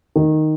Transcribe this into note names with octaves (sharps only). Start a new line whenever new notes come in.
D#3